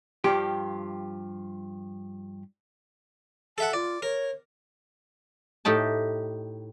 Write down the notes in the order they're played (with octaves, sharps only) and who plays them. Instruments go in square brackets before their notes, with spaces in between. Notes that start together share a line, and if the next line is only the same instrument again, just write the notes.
[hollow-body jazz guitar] G2 F3 G4
[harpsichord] A4 E5 F#5 [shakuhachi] A5
[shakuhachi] F4 [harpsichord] D5
[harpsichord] A#4 [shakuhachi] C#5
[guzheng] A2 D#4 G4 A5